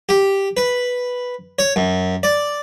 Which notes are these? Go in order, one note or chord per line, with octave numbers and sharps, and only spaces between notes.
G4
B4
C#5
F#2
D5